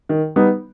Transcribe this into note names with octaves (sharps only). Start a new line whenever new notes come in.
D#3
G3 B3 D#4